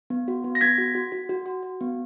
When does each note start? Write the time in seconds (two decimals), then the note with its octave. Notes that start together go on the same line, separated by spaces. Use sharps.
0.10 B3
0.28 F#4
0.44 B3
0.55 A#6
0.61 B3 G#6 B6
0.78 F#4
0.95 F#4
1.12 F#4
1.29 F#4
1.46 F#4
1.63 F#4
1.81 B3